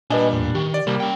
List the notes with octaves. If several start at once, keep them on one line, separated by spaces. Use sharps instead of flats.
A#2 G3 D4 B4 D#5 G#5
E2 A2
D#3 G4
D5
C2 G3 A#3
C#4 G5